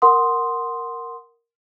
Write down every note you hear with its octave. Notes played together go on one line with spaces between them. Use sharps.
A#4 F#5 C6 D#6